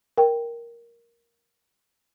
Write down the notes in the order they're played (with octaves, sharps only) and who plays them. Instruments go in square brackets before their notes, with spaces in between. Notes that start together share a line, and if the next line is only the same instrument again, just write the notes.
[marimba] A#4 G5